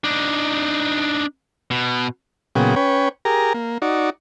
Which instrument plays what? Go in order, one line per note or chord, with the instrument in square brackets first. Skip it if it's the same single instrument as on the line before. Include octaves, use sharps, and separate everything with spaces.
[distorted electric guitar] D4 D#4
B2
[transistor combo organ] A#2 C#3 F#3 B3 G#4 G5
C#4 B4 C#5 G5
G4 G#4 A#4 A#5
A#3
D#4 F#4 D5